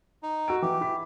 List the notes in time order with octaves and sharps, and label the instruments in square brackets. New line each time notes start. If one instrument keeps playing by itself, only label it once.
[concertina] D#4
[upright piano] F#4 E6 D7
[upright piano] E3 [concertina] G4
[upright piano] E4 B6